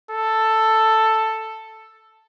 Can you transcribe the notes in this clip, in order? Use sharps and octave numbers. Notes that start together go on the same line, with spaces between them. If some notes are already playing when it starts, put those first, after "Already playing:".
A4